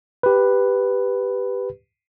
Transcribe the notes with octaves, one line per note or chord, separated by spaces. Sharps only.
G4 B4